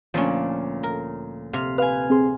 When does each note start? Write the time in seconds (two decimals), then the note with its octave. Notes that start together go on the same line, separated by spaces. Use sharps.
0.14 D2 A#2 F3 C#4 D4
0.83 A#4
1.53 C3 F5 F6
1.78 B4 F5 G#5 F6
2.10 C4 G#4 C6